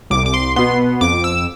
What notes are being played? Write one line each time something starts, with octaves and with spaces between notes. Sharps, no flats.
C2 D6
D6
C6
B2 B3 C6
F2 D6
E6